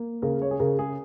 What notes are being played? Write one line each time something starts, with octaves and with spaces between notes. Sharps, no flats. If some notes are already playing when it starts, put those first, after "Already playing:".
Already playing: A#3
C#3 A#4
C#5
G#4
C#3 A#4
G#4